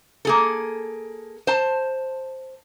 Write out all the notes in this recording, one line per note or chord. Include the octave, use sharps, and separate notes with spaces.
A#3 G#4 A4
C5 A5